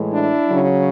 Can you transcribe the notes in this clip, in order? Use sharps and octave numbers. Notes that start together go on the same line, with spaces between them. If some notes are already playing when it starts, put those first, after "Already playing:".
Already playing: A2 E3 G#3
D4 E4
C#3 F#3